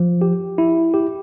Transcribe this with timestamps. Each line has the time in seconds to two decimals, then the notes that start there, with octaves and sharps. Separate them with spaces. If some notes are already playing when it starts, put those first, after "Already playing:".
Already playing: F3
0.22 G4
0.58 E4
0.94 G4